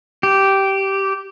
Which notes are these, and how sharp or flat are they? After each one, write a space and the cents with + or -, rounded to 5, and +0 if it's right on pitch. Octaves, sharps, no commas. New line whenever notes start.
G4 -10